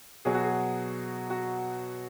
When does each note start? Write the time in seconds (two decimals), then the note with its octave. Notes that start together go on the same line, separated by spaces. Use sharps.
0.25 B2 F#3 G#4
0.34 F#4
0.43 G#4
1.30 F#4